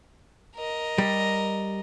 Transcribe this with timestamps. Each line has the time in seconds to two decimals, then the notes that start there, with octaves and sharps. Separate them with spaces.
0.55 A#4 D#5
0.98 G3